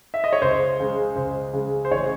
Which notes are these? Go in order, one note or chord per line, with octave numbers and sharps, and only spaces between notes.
E5
D#5
C#5
C#2 C5
C#3 G#3
C#2 C5
C#3 G#3
C5
A1 C#5